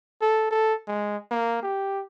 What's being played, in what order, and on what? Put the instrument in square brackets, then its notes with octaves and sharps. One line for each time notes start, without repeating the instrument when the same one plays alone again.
[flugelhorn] A4
A4
G#3
A#3
G4